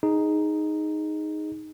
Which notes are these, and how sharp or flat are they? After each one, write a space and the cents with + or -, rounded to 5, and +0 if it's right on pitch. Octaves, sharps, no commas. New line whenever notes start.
D#4 +0 G#4 +0